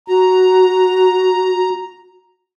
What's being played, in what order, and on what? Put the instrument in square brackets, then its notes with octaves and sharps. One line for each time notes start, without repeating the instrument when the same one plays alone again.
[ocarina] F#4 [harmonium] A#5